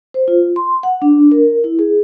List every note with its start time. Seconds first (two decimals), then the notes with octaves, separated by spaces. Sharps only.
0.14 C5
0.28 F4
0.56 C6
0.83 F#5
1.02 D4
1.31 A#4
1.64 E4
1.79 G#4